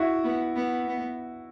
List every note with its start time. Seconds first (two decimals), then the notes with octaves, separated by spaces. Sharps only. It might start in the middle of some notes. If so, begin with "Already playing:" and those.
Already playing: E4 F#4
0.24 B3
0.56 B3
0.87 B3